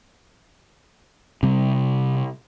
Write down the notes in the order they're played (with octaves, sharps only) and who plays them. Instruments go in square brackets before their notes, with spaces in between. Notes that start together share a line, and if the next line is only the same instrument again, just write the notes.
[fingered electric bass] C3 G3